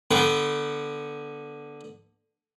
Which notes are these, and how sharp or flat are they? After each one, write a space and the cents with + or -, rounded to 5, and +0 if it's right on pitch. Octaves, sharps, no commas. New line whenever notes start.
D3 +0 B3 -15 G5 -35